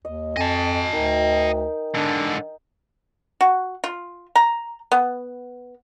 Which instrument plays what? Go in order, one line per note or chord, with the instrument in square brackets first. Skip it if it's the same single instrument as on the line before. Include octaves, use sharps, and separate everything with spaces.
[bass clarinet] D#2 [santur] D#5
[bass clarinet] F2 [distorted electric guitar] D#5 A5 [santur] G#5
[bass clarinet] D2 [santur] D#4 A#4 G5
[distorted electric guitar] G#2 D3 [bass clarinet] D4
[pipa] F#4
F4
A#5
B3